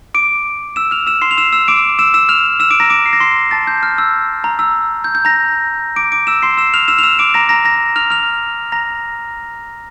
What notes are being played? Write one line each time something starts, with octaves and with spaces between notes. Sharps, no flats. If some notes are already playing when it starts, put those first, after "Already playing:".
D6 D7
E6 E7
F6 F7
E6 E7
C6 C7
F7
E6 E7
E6 E7
D6 D7
E6 E7
E6 E7
F6 F7
E6 E7
D6 D7
A#5 A#6
D6 D7
C7
A#6
C6 C7
A5 A6
G6
F6
E6
A#5
E6
G6
G6
A#5 A#6
D6 D7
D6 D7
E6 E7
C6 C7
E6 E7
F6 F7
E6 E7
F7
E6 E7
D6 D7
A#5 A#6
A#5 A#6
A#5 A#6
F6 F7
F6 F7
A#5 A#6